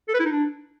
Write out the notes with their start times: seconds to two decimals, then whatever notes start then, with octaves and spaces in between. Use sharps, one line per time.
0.08 A4
0.14 B4
0.20 E4
0.25 D#4
0.31 D4